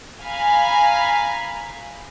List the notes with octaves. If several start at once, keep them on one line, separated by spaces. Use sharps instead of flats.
F5 G#5 A#5 B5